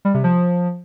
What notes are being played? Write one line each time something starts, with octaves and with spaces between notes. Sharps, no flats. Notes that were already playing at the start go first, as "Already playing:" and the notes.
G3
C3
F3